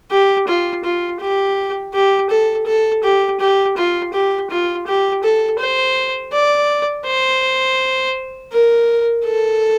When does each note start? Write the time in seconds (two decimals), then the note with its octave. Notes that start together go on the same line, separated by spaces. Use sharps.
0.11 G4
0.48 F4
0.84 F4
1.20 G4
1.94 G4
2.30 A4
2.67 A4
3.03 G4
3.40 G4
3.77 F4
4.13 G4
4.50 F4
4.87 G4
5.23 A4
5.59 C5
6.33 D5
7.05 C5
8.52 A#4
9.25 A4